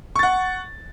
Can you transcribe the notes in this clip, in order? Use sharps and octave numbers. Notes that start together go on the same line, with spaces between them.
F#5 C#6 A6